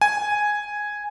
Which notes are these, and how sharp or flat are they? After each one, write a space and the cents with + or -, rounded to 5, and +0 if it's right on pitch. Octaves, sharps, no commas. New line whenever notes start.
G#5 +0